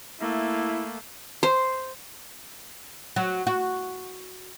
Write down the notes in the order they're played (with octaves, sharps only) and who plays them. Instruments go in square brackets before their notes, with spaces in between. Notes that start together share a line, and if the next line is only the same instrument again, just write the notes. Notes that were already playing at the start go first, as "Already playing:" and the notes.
[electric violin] A3 A#3 [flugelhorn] E4
[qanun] C5
[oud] F#3
F#4